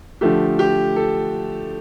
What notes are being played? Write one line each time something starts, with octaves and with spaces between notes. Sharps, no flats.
D3 F3 A3 G4
G4
A4